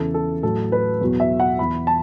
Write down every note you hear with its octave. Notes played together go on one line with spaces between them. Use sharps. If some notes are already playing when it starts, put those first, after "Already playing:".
Already playing: E2 C#3 E3 A4
A4
A2 F#3 A4
B4
E2 B2 F#3
E5
F#5
E2 E3 B5
A5